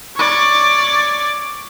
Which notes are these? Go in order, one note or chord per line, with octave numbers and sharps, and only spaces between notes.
C#5 D5